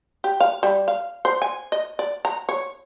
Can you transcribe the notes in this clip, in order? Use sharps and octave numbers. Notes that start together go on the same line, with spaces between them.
G4
F5
G3
F5
C5
G#5
D#5
D5
A#5
C#5